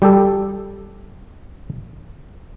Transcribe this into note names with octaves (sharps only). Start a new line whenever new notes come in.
G3 G4 A4